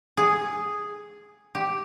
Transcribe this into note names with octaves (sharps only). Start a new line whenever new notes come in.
G#4
G4